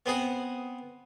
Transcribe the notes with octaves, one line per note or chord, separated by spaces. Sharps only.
B3 C4 G#4 F#5